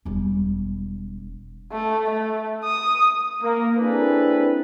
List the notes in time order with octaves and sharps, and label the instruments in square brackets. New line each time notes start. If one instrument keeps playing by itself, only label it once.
[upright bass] E1 G3
[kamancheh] A3
A3
D#6
[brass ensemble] A#3
C4 D4 E4 G#4 A4 B4